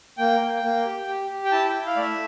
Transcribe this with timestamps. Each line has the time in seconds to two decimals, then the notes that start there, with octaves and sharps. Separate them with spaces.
0.18 A#3 G5
0.41 A#3
0.63 A#3
0.85 G4
1.08 G4
1.30 G4
1.45 G5
1.52 E4 A5
1.69 G5
1.75 E4
1.86 F5
1.96 A3 D5
2.02 E5